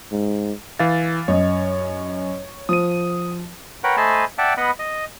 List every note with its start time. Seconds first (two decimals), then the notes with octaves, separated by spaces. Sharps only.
0.12 G#2
0.79 E3 F5 A6
1.28 F#2 C#5 D#5
2.69 F3 D#6 D#7
3.84 A#4 B4 C#5 F#5 G5
3.97 A3 C5 D#5 G#5 A5 B5
4.38 D5 E5 F#5 G5 A5
4.57 B3 D#5 F#5 B5
4.79 D#5